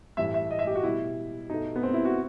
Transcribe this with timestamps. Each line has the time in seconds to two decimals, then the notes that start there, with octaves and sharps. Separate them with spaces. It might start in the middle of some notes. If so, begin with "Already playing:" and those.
0.17 A2 E3 G3 E5
0.34 E5
0.51 D#5
0.59 E5
0.67 G4
0.75 F#4
0.83 B2 G3 E4
1.49 B2 A3 D#4
1.76 B3
1.83 C4
1.94 E4
2.05 F#4